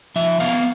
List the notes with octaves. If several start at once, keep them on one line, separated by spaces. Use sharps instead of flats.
F3 E5
B3 F5